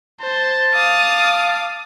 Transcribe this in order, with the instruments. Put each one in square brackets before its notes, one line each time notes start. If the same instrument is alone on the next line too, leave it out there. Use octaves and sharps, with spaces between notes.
[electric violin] C5 [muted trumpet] A5
[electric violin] F5 [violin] D6 D#6